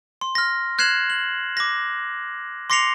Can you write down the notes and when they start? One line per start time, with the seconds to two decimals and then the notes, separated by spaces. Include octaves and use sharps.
0.21 C6
0.35 F6 A#6
0.78 F6 F#6 G#6 C7 E7 F#7
1.10 F#7
1.57 D6 A#6
2.70 C6 D6 A#6 C7 C#7 F7